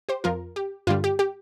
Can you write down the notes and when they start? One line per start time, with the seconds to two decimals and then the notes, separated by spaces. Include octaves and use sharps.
0.09 G4 C5
0.24 F2 F3 F4 A#4
0.56 G4
0.87 G2 D3 G3 F4
1.04 G4
1.19 G4